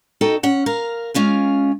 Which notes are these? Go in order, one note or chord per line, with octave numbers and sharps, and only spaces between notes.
D#4 F#4 A4 D#5 G5
C#4 F#5
A#4 F5
G#3 C#4 F4 F5